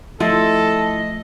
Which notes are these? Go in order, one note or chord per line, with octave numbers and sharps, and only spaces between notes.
F3 A3 E4 F4 A4 D#5